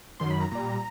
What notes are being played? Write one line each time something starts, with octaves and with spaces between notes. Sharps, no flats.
F#2 D#3 F#3 C6
B5
A#5
A#2 G3 A#5